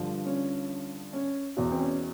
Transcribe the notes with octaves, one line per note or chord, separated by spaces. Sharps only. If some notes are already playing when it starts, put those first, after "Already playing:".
Already playing: G2 D3 F3
C#4
C#4
E2 B2
C4
C#4